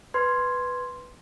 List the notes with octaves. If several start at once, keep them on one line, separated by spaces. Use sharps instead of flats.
B4 C6 G#6